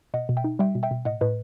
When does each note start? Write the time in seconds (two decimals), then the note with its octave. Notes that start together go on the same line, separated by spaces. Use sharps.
0.14 B2 D#5 F#5
0.29 B2
0.37 E5 G5
0.44 D#4
0.59 G3 E5 G5
0.75 B2
0.83 E5 G5
0.91 B2
1.05 A2 D#5 F#5
1.21 A2 B4 D#5